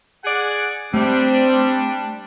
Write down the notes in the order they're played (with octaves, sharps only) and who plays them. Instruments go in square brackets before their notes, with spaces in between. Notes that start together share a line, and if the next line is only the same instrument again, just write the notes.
[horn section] G#4 D5 F#5
[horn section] G3 D4 [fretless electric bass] A3 [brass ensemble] C4